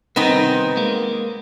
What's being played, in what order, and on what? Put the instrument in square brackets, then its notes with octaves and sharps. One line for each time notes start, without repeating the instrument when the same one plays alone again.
[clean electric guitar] G2 C3 D#3 [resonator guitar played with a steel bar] B3 C4 D#4
[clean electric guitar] G#3 A#3